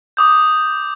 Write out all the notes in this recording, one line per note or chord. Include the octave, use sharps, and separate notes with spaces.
D6 D#6 G6